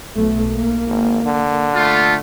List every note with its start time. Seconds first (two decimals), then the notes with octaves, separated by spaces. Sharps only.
0.15 B1 A3
0.50 A#3
0.87 G#1
1.25 D3
1.75 A3 F4